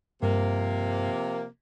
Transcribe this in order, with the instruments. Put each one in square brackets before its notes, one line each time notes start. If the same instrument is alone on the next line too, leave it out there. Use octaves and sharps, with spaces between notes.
[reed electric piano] G2 [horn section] C3 F3 A#3